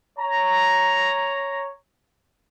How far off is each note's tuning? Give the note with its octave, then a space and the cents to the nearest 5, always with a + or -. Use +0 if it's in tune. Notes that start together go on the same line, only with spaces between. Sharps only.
C#5 +0 A#5 +0